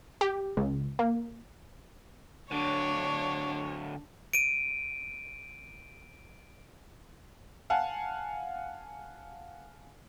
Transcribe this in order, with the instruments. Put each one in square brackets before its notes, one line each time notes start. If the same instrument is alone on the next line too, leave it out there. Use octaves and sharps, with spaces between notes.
[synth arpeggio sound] G4
C#2
A#3
[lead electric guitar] D3 F#3 [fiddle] D4 [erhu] C#5
[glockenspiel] D7 D#7
[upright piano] F5 F#5 G#5 A5